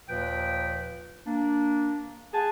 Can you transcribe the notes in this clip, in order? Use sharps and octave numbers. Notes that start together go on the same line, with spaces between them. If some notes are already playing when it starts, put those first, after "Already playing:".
D#2 A#2 F3 B4 G5
A#3 D4
G#4 F#5 G#5 A5